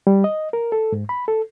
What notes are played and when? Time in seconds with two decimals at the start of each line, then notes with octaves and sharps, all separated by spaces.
0.07 G3
0.24 D#5
0.53 A#4
0.72 A4
0.92 G#2
1.09 B5
1.28 A4